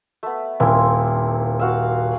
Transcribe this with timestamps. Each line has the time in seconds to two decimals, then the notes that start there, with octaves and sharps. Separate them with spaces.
0.23 A3 B3
0.60 D#1 A#3 C4 E4
1.60 F#4 F5 E6